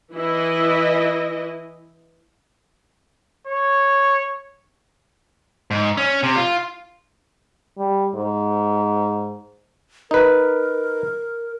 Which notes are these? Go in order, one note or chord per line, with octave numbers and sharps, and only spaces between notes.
E3 E4 D#5
C#5
G#2
C#4
C3
F4
G3
G#2
D#4 A#4 B4